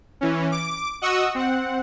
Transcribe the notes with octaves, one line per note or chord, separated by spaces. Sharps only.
E3 C#4
D6
F#4 D#5 F#5 C#6 D#6 E6
C4 F#5